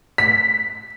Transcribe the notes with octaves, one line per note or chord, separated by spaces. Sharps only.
B6